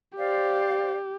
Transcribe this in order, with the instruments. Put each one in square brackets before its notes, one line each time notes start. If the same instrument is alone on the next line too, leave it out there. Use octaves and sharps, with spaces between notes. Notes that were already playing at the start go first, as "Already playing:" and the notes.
[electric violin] G4 [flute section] C5 D5 F5